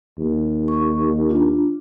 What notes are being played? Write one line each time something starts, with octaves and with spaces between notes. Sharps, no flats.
D#2
C#6
D4 F4